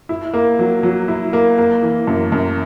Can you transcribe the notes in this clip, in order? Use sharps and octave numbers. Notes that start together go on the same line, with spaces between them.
E4
A#3
F#3
F#3
E4
A#3
A#3
E3
F#2
F#2